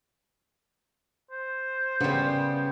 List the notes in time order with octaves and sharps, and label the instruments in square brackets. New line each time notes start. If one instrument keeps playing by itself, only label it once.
[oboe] C5
[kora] C#3 [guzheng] G3 B3